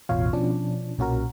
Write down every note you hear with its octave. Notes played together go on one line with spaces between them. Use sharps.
A1 E2 B2 F4 C#5 F5
B2 F3 C#4 D4
B1 A#2 C#4 F#4 A#4